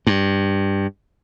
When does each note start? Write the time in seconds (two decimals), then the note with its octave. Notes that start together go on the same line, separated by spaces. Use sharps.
0.07 G2